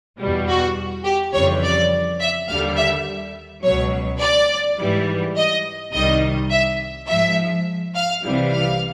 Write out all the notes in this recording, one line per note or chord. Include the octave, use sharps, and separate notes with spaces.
E2 B2 G3
F#4
G4
F2 C#3 E3 G3 C#5
D5
E5
D#2 D3 G3 F5
E5
C#2 B2 F#3 C#5
D5
G#2 E3 G3
D#5
C2 C3 D#3 G3 D#5
E5
G#2 F3 E5
F5
C2 C3 E3 G3
F5